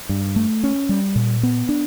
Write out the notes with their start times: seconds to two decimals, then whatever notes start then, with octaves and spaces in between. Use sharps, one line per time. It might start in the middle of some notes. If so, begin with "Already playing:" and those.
0.09 G2
0.36 A3
0.64 C#4
0.89 G3
1.16 A#2
1.43 B3
1.69 D4